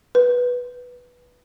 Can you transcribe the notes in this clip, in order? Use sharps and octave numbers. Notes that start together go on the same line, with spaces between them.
B4